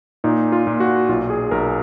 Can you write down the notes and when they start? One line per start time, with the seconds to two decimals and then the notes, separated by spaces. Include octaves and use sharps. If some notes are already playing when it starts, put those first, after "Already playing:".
0.24 A#2 D#4
0.52 F4
0.67 A#2
0.80 F#4
1.09 B1 F4
1.30 G#4
1.51 B1 A#4